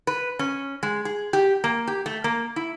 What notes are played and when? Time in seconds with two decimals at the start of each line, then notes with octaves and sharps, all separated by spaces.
0.07 B4
0.39 C#4
0.83 G#3
1.05 G#4
1.33 G4
1.64 A#3
1.88 G4
2.06 A3
2.24 A#3
2.56 E4